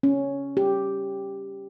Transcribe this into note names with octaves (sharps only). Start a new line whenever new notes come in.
C#4
G4